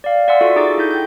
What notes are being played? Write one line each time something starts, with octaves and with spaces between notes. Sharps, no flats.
D5 F5
D5 E5 F#5 G#5 C6 E6
F4 F#4 A4 C#6
D#4 G#4 C#6 D6 A6
E4 A4 G6
G5 G6